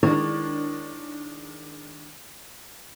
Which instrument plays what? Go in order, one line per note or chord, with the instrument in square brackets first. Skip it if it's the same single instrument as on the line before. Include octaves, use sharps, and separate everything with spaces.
[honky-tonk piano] D#3 G#3 D4 [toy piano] E4 A#4 [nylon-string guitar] C#5